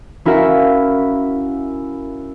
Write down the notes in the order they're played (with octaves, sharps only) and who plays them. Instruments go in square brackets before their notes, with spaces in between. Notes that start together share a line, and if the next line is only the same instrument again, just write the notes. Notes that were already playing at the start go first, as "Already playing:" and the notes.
[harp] C#4 E4 F#4 A#4 E5 F5